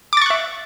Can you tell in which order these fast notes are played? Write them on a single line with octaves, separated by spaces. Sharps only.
D6 A6 C#6 F#6 E5